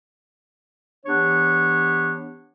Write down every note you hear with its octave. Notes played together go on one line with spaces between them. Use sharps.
E3 B3 D4 G4 C#5